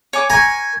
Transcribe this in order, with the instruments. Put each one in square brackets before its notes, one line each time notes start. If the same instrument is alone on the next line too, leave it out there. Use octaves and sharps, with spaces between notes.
[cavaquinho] C#5 G#5 D6
[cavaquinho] A#4 C#6 [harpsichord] G#5